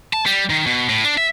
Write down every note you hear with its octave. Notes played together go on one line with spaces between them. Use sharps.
A5
G3
D#3
B2
A2
D4
E5